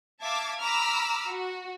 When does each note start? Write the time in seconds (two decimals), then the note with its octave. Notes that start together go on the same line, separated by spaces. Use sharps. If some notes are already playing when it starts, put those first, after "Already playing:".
0.21 E5 F5 A5 D6 E6 G#6
0.61 A#5 B5 D6 E6 F6
1.27 F#4